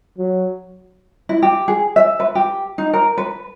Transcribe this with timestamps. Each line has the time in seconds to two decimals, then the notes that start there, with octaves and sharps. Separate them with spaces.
0.18 F#3
1.29 E4
1.42 G4
1.68 G#4
1.96 E5
2.20 B4
2.35 G4
2.78 D#4
2.93 A#4
3.18 B4